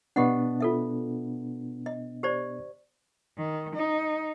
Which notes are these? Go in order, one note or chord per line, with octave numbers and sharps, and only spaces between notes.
B2 B3 D4 G4 D#5 F#5
F4 A4 E5
D#5
G4 C5 D5
D#3
D#4